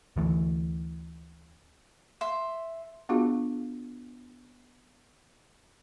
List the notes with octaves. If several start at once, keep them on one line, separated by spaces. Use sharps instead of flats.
D2 E3 A3
E5 C6
B3 D4 F4 F#4 G#4 F5